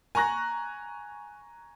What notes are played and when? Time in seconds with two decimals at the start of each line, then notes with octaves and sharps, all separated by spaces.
0.15 G#5 A#5 C#6 F#6 A#6